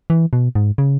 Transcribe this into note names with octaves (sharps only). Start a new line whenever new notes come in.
E3
B2
G#2
C#3